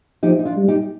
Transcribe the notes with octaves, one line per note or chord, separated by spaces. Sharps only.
F3 D#4 G4
D#4
D4 F4
G3
D#4 G4